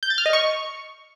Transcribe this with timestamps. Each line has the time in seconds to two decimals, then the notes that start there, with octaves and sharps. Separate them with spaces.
0.03 G6
0.10 A6
0.18 F6
0.26 D#5
0.33 C#6